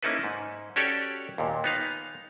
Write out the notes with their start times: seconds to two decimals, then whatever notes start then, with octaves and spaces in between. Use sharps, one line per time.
0.03 A#3 C#4 D#4 E4 A4 B4
0.24 G#2
0.76 C#4 F#4 G4 A4 C#5 D5
1.38 D#2 A#2
1.64 B3 D#4 F5